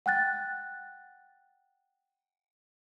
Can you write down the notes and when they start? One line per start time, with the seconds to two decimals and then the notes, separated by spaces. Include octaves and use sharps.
0.06 F#5 G5 F#6 A6